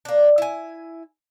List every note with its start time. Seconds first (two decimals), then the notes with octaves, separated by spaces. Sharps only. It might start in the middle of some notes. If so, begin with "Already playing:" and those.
0.05 A#3 D4
0.38 E4 G#5